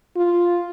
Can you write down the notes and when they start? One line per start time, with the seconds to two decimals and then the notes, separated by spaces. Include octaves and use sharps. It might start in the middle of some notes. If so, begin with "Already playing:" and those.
0.16 F4